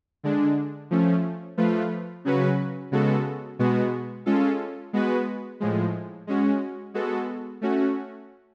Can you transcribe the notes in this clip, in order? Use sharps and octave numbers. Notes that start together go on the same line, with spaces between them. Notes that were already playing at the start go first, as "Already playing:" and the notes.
D3 G#3 D4
F3 A3 C#4
F3 A3 F4 B4
C#3 F#3 C#4 F#4 B4
C#3 G#3 B3 F#4 A4
B2 G#3 B3 F#4
G#3 C#4 F4 A4
G#3 B3 F#4 B4
A2 F3 G#3
G#3 C#4 F#4
G#3 B3 F#4 A4
A3 C#4 F#4